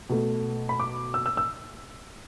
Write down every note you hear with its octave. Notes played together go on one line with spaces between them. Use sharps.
B2 A3
B5
D6
E6
E6
E6